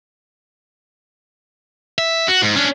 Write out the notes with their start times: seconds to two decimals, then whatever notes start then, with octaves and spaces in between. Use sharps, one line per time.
1.98 E5
2.28 F#4
2.42 G#2
2.56 C#4 D4